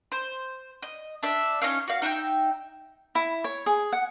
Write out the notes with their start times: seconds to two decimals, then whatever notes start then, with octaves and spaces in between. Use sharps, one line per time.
0.12 C5
0.83 D#5
1.23 D4 E5
1.62 C#4 D#4 C#5 F5
1.88 F#4 F5
2.02 D#4 E5 F#5 G5
3.15 E4
3.44 C#5
3.66 G#4
3.93 F#5